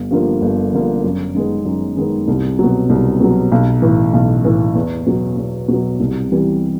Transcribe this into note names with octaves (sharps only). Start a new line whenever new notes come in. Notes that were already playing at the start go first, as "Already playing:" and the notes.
Already playing: G1
G2 D3 F3 A#3
G1
G2 D3 F3 A#3
F#2
D#3 G#3 B3
F#2
D#3 G#3 B3
C2
B2 F#3
C2
B2 F#3
B1
A2 E3
B1
A2 E3
E2
B2 F#3
E2
B2 F#3
C2
C3 E3 G3 B3